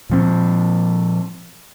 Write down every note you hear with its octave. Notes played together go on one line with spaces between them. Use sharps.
A#2 F3 C4